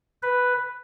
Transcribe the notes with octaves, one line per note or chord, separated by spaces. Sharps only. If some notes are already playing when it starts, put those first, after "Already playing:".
B4